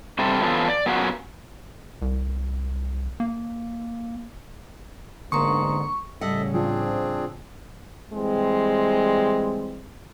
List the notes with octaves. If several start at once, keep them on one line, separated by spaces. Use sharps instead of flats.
C3 G3 A4 C5
E3 F3 B3 C#4 F4 A4
D5
F#3 A#3 B3 C#4 F4 F#4
C2
A#3
E2 G#2 D3 A#3 A#5 C6 C#6 D#6
A2 C#3 G3 A4 D#5 E5 F#5
F3 C4 D4 G#4
E3 G3 G#3 C4